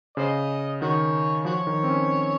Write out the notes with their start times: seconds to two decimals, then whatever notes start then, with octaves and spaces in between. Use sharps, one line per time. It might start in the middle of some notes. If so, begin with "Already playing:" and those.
0.17 C#3 C5 D#5
0.81 D#3 F#4 C#5
1.45 F3 F#4 C#5
1.67 D#3
1.84 C4
1.89 C#4